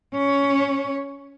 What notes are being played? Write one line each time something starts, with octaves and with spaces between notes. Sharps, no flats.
C#4 C#5